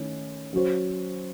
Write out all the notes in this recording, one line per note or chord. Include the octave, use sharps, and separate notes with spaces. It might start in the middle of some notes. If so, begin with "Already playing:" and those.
Already playing: D#3 A3 C#4 E4
F#3 C#4 F#4 C5